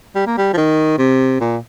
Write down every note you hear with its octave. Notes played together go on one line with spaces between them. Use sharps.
G3
A#3
G3
F3
D#3
C3
A#2